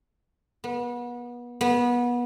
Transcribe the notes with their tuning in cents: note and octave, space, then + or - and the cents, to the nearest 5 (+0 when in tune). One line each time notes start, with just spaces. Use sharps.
B3 -30
B3 -25